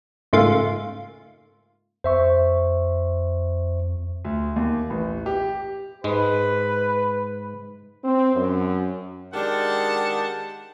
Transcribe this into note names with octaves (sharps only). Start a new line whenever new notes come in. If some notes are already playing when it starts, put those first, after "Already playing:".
G#2 C#3 A3 A#3 F4
F2 C5 E5 C#6
D2
D#2
A1
G4
G#2 G#3 B4
C4
F#2
D#3 G#3 D4 G4 F#5 A5